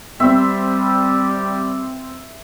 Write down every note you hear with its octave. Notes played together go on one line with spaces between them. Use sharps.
G3 C4 E5